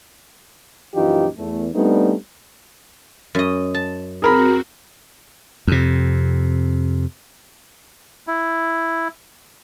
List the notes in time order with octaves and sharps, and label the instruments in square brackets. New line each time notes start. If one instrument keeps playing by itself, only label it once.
[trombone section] A#1 F#2 E3 D#4 F4 G4
E2 A3
G3 A3 B3 C4 D4 D#4
[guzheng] F#2 D#5
A5
[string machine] C4 F#4 [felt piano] G#4 A#4 B5
[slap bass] F2 C3
[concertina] E4